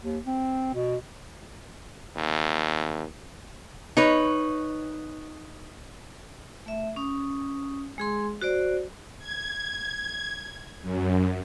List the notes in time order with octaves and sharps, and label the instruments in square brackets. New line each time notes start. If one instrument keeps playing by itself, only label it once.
[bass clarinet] D#2
C4
B2
[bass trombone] D#2
[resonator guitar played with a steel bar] D#4 B4 C#5
[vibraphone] A3 E5
C#4 D#6
G#3 G#4 C6
F#4 C5 D5
[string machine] G#6
F#2